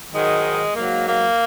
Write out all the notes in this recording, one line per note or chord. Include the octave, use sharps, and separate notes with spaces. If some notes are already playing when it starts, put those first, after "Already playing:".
G#2 D#3 F#3 G#3
G#2 F#3 A#3
A#3